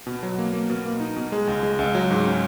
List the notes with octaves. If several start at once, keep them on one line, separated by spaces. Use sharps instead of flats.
B2
F#3
A#3
A#3
B2
A#3
D#4
B2
G#3
C#2
G#3
C#2
F#3
G#2
C#4